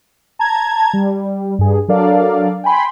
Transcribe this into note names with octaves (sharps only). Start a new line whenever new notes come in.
A5 A#5 G#6
G3
G2 G#4
F#3 D4 A4 A#4 D5 F5
G5 G#5 B5 C6